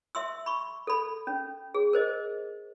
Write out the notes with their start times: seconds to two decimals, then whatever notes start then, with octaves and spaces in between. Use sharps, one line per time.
0.15 E5 C6 E6
0.46 B5 C#6
0.87 A4 B5
1.27 C#4
1.74 G#4
1.93 A#4 C5 D#5